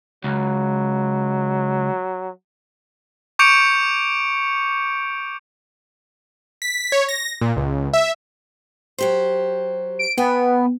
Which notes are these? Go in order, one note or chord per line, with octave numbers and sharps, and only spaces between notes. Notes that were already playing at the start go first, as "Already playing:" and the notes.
C#2 F#3
C#6 D6 G6 C#7 D7 F7
B6
C#5
A#6
A#2
C#2
E5
F#3 G4 C5
D7
B3 G5 G#5